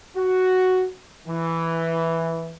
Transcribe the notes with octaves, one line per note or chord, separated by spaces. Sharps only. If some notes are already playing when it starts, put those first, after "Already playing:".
F#4
E3